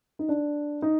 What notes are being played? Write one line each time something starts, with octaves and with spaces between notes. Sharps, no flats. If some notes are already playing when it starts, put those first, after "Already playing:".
D#4
D4
D#4